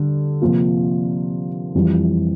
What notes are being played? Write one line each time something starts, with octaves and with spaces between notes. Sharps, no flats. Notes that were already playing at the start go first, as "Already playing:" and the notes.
Already playing: D3 G3
C3 F3 A#3 F4
F2 E3 G3